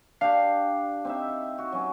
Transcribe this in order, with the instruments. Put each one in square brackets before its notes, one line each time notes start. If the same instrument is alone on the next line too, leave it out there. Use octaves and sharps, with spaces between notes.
[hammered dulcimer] D4 G4 [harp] F5
[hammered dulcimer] C4 D#4 E5
F#4
F#3 C#4